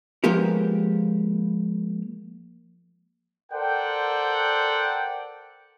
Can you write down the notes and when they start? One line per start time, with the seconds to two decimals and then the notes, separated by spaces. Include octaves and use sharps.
0.24 F3 G#3 A#3 B3 G4 A#4
3.52 A4 A#4 C5 D5 F#5 G5